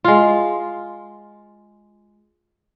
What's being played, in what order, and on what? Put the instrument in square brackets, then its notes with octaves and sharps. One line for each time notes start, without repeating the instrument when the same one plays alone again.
[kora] G#3 F4